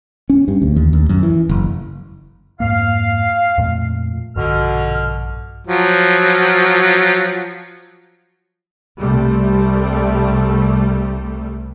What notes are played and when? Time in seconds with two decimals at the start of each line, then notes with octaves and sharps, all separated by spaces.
0.30 C#4
0.48 G2
0.62 D2
0.76 D#2
0.93 D#2
1.09 F#2
1.23 E3
1.49 F#1
2.60 F2 G#2 A#3 F5
3.58 F2 A#2 A3
4.36 A#1 G2 B2 D3 F6
5.67 F3 F#3
8.97 C2 C3 G3 A3